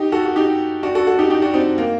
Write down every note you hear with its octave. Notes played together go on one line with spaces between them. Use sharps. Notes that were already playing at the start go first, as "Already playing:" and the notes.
Already playing: D#4 G4
F#4 A4
F#4
D#4 G4
D4 F#4
F#4 A4
F#4 A4
D#4 G4
D#4 G4
D4 F#4
C4 D#4
A#3